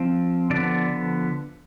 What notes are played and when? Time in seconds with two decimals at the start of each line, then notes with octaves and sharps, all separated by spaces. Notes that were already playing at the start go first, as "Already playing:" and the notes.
Already playing: F3 C4
0.50 D3 F3 B3 D5